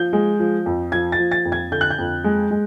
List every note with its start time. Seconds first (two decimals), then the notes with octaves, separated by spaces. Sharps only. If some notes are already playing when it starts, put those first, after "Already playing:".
Already playing: F3 G6
0.13 G#3
0.39 F3
0.66 F2
0.92 F3 G#6
1.12 A6
1.19 F3
1.31 A6
1.45 F2
1.52 G#6
1.72 D3 G6
1.81 F#6
1.90 G6
1.98 F2
2.24 G#3
2.51 G#3